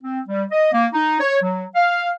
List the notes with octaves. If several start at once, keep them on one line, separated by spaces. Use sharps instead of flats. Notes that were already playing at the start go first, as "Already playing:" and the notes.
C4
G3
D#5
A#3
D#4
C#5
F#3
F5